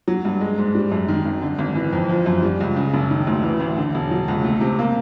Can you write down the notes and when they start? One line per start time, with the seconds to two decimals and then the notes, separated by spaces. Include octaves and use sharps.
0.08 F#3
0.25 G2
0.41 G#3
0.58 G#2
0.75 G3
0.92 F#2
1.08 D#3
1.25 G#1
1.42 D3
1.58 G#1
1.75 E3
1.93 F2
2.09 F3
2.26 F#2
2.42 G3
2.60 C#2
2.76 C#3
2.93 F#1
3.10 D#3
3.27 D2
3.43 E3
3.60 A1
3.77 D3
3.94 E1
4.11 F#3
4.28 C#2
4.44 A3
4.61 C3
4.79 A#3